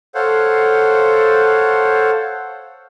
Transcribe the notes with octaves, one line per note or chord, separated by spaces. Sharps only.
A4 C5 C#5 F5 F#5